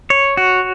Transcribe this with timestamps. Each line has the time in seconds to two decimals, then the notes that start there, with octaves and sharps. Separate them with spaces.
0.10 C#5
0.37 F#4